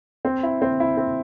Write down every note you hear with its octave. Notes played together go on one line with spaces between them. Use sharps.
C4
E4
C4
E4
C4